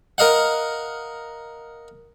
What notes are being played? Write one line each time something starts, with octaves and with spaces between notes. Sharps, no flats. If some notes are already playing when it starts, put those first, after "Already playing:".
A#4 D#5 F5 F#5